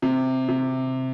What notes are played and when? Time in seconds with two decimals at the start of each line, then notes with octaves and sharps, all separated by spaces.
0.02 C3
0.48 C3